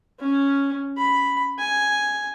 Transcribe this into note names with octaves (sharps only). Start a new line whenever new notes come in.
C#4
B5
G#5